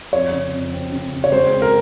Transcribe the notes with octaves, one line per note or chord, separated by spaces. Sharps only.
F2 C#5
C#3
F2
C4
C#3
C#3
C#5
G#3 C5
C4
A#4